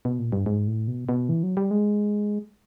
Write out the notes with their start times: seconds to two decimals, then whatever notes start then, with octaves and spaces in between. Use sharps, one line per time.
0.05 B2
0.19 A#2
0.32 G2
0.46 G#2
0.67 A2
0.88 B2
1.09 B2
1.29 E3
1.43 F#3
1.57 G3
1.71 G#3